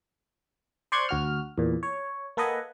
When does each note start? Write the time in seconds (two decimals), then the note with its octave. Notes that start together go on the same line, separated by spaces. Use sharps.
0.92 C5 D5 C6 C#6 F#6 G#6
1.09 D2 F#4 F6
1.58 E2 A#2
1.83 C#5
2.37 A#3 A4 B4 D#5 F#5 G#5